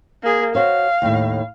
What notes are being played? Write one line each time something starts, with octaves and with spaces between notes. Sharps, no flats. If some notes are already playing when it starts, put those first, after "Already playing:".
A#3 G#4
F#4 C5 C#5 F5
D#2 A2